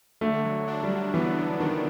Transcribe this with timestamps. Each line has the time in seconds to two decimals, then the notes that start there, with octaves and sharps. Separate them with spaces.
0.21 D3 A3
0.45 F#3
0.68 D4
0.83 G3
0.91 F#3
1.14 E3 B3
1.37 F#3
1.60 D#3 D4